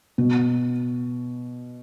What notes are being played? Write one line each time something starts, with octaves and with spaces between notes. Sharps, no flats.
B2